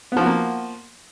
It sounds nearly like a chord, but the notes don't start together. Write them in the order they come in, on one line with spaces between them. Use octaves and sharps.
B3 F3 F#4 A#3